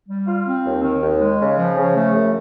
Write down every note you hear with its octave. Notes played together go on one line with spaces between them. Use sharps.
G3
F4
C4
D#2
D#3
D#2
G#3
C#3
F3
C#3
A3
F#2